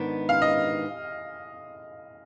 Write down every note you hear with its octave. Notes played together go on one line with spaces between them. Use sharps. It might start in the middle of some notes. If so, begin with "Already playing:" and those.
Already playing: G#2 D#3 B3 D4
F5
D#5